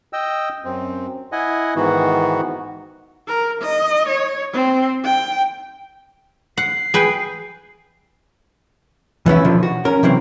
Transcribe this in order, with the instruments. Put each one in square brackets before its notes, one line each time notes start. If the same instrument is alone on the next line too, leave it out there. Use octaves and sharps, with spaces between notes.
[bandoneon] D#5 G5 E6
F#2 C4
E4 D#5 F#5 G#5
G#2 D#3 E3 B3 F#4
[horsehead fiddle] A#4
D#5
C#5
C4
G5
[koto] F#5 [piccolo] C7
[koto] G#4 B4 G5
[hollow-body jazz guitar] E3 B3 C#4 E4
B2 D3 D#3 F3
F#4
C#4 A#4
C3 E3 F#3 C4